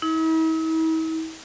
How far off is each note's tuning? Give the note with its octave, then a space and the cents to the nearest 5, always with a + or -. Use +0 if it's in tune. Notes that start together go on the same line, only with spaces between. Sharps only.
E4 -45